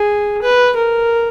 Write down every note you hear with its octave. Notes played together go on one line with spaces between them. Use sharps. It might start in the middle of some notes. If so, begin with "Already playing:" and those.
Already playing: G#4
B4
A#4